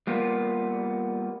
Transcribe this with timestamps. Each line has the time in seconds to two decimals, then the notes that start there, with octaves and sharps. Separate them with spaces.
0.07 G3 A#3 B3 F4